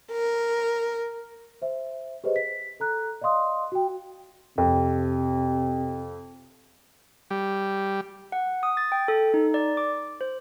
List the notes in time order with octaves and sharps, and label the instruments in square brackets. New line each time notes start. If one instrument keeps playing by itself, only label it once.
[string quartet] A#4
[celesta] C5 E5
G4 G#4 B4 C5 D#5
B6
A4 A#5 F#6
D5 D#5 F5 C6 D#6
F#4 G5
[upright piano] F2 [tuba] C3
[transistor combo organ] G3
[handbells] F#5
D#6
A6
G5
A4
D#4
D5
D6
C5